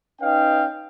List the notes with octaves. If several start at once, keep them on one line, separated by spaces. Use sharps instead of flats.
C#4 D#4 B4 D#5 F5 G5